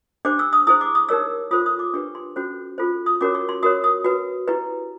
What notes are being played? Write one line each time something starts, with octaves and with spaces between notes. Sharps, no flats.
D4 G4 C5 D6
E6
D#6
E4 G#4 C5 D#6
D6
D#6
D#4 G4 A#4 C#5 E6
F4 A4 C5 D#6
D#6
D6
D4 G4 B4 C#6
C6
C#4 F#4 A4 C5
F4 A4 C5
D#6
C#4 F#4 A#4 C#5 D6
C#6
C6
F#4 A#4 C#5 D#6
D#6
F#4 B4
E4 G4 B4